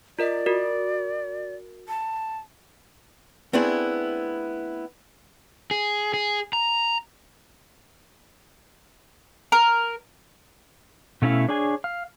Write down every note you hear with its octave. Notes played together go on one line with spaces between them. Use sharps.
F4 A#4 D5 D#5
F#4 A#4
A5
A3 B3 C4 D4 E4 G#4
G#4
G#4
A#5
A#4
B2 A3 C#4 E4 F5
D4 G#4 C#5 G#5
F5